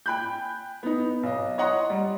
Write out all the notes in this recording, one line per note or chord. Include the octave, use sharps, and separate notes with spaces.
G5 G#5 B5 F#6 G6
B3 D#4
B1 D#5
C#5 D#5 F#5 A#5 C6
G3